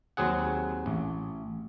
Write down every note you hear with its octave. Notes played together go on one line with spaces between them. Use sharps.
D#2 F#3 C4 G#4 F#5
A1